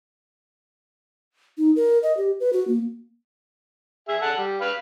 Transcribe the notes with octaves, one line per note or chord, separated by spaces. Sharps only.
D#4
A#4
D#5
G4
B4
F#4
A#3
G#4 E5
A4 F#5 A5
G3
B4 F5